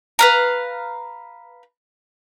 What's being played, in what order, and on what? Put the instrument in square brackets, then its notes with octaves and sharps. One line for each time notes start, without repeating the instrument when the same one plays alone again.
[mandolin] B4 F5 A#5